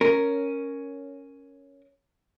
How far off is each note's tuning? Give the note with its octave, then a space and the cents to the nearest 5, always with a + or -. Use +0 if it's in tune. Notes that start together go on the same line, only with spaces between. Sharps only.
C#4 +0 A#4 +0